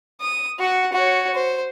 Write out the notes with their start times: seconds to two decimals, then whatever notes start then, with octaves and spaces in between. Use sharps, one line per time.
0.21 D#6
0.59 F#4 F#5
0.93 F#4 C#5
1.34 C5